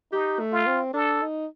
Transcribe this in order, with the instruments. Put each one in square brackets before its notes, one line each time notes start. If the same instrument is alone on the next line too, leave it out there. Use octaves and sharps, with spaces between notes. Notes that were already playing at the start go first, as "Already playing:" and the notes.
[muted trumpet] D#4 [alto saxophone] G4
[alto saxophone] A3
[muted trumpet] F4
[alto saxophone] C4
[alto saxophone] D4 [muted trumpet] A4
[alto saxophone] D#4